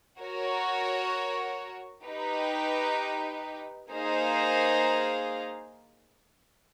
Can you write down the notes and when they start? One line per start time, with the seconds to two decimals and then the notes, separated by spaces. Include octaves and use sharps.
0.19 F#4 A#4 C#5
2.05 D#4 G4 B4
3.91 A#3 D#4 G#4 C5 F5